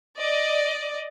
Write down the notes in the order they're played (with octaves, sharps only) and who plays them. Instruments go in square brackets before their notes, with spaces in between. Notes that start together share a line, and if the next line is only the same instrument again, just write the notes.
[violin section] D5 D#5